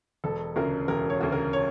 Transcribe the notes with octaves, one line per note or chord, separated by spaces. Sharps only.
E1 A4
D2 C#3 A#4
E1 A#4
C#5
D2 C#3
A#4
C#5